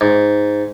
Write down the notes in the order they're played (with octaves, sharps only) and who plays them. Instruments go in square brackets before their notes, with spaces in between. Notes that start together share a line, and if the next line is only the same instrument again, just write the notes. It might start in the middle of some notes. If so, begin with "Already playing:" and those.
[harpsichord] G#2